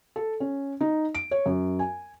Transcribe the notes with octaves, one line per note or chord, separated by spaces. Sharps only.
A4
C#4
D#4
D7
C#5
F#2
G#5